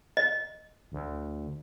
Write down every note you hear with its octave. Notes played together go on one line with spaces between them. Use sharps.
D#5
D2